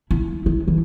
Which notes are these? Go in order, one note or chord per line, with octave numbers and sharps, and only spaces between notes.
E4
E4
E3